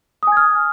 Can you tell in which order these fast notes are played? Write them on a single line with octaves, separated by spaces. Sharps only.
D#6 G#5 G#6 F6